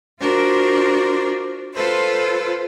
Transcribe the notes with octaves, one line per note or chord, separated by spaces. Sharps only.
D4 F4 F#4 A#4 C5
F4 A4 B4 C5